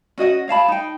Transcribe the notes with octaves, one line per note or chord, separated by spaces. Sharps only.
C#4 F#4 D#5 F#5
C#5 F5 A5 B5
D#4 G5